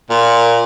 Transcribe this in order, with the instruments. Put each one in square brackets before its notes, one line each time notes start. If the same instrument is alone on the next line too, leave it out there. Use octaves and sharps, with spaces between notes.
[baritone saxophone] A#2